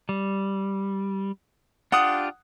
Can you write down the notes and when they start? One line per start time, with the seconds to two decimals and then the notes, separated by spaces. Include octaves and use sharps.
0.09 G3
1.92 D4 F4 G4 F#5 D#6